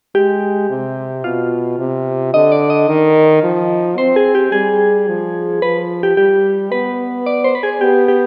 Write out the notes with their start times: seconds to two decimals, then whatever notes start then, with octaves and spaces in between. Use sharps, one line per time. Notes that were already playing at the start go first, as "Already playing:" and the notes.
0.15 G#3 G4
0.70 C3
1.24 B2 F4
1.78 C3
2.34 D3 D#5
2.52 D5
2.70 D#5
2.88 D#3
3.43 F3
3.98 C4 C5
4.16 G#4
4.35 G4
4.52 G3 G#4
5.07 F3
5.62 F3 B4
6.03 G4
6.17 G3 G4
6.72 B3 B4
7.26 D5
7.44 C5
7.55 B4
7.63 G#4
7.81 B3 G4
8.08 G4